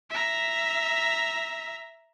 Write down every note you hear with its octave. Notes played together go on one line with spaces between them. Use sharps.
E5 A#5